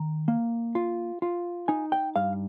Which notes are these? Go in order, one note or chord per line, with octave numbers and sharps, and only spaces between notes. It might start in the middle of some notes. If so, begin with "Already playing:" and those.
Already playing: D#3 A#5
A#3
F4
F4
D#4 G#5
G5
G2 F5